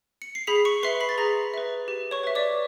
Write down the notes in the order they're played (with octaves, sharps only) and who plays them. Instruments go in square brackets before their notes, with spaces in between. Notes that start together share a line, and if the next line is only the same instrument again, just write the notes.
[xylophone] C#7
C7
G#4 B5 B6
C#6 C#7
B4 E5 C6 C7
B5 B6
A6
G#4 A#5 A#6
B4 E5
G4
C#5 C#6
B4 E5
D5 D6